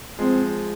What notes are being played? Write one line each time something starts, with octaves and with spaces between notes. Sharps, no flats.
F3 G#3 C4